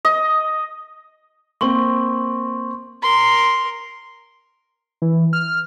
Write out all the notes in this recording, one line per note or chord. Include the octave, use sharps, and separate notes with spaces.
D#5
A#3 C4 C6 C#6
A#4 C6
E3
F6